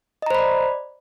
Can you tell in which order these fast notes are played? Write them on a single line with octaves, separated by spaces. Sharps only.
D#5 A#5 C5 B5 D5